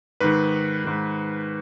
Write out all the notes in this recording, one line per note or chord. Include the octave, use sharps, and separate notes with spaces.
G#2 D#3 B4
G#2 D#3